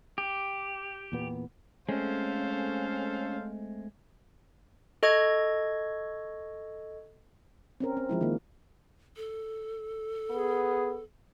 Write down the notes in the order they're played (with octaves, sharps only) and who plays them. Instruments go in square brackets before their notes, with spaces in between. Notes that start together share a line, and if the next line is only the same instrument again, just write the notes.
[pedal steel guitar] G4
[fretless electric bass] E2 A#2 B3
[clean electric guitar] G#3 A3 C4 [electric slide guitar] C#4 [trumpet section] A4 C5 F5
[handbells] A4 D#5 C#6 G#6
[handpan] C4 C#4 A#4
C4
F3 G#3 E4
D#3 A#3
[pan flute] A4
[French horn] B3 [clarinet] G#4